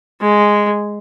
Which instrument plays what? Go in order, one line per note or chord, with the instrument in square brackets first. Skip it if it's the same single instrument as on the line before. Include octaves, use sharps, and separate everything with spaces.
[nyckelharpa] G#3